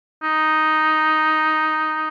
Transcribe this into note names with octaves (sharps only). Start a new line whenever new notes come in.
D#4